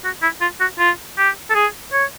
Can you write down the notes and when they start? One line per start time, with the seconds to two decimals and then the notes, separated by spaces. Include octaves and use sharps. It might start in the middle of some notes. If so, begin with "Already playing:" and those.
0.04 F#4
0.22 E4
0.41 F4
0.60 F#4
0.79 F4
1.18 G4
1.50 A4
1.55 G#4
1.93 C#5